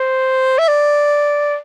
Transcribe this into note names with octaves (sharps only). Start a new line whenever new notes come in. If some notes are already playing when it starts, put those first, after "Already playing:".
Already playing: C5
E5
D5